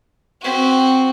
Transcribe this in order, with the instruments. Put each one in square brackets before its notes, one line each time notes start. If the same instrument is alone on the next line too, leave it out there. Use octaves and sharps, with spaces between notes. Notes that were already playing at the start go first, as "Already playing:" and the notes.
[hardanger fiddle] C4 F#4